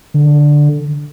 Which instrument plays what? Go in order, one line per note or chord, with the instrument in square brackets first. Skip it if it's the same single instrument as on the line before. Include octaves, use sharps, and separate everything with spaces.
[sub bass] D3